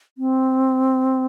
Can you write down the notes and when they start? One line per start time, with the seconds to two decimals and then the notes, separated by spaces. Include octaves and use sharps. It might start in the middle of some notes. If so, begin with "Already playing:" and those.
0.18 C4